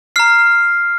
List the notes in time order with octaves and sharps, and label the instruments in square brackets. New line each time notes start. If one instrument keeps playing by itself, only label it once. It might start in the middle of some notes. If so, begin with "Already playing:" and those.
[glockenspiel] A#5 F6 C7